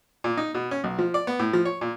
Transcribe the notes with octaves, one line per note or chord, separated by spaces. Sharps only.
A#2
D#4
B2
C#4
B1
F3
D5
B3
A2
F3
C#5
A#2